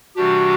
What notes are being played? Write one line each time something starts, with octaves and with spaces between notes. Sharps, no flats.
C3 E3 G3 D4 F#4 G4